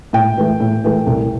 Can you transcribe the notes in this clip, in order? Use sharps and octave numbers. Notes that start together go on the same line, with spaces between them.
A2 G5
E3 A3
A2
E3 A3
C2